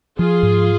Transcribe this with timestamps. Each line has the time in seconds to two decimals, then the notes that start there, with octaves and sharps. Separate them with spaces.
0.19 F3 F4 G#4
0.43 G#2